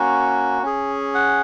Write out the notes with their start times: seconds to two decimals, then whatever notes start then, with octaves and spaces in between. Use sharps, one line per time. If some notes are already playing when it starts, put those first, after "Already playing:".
Already playing: A#3 C#4 F#4
0.63 C#4 G#4
1.15 F#5